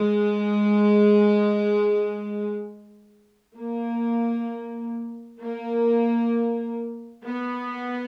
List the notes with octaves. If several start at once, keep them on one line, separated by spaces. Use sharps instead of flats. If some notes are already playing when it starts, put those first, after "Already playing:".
Already playing: G#3
A#3
A#3
B3